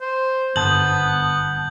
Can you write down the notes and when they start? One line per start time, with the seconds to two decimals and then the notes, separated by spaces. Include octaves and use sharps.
0.01 C5
0.56 G1 B3 A5 D#6 G6 F#7